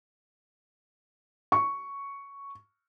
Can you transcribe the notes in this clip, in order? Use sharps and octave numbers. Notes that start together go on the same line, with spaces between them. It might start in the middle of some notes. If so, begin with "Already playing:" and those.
C#6